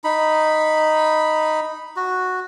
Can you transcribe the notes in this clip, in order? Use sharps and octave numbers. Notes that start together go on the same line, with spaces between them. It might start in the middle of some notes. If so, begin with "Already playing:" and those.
D#4 B5
F#4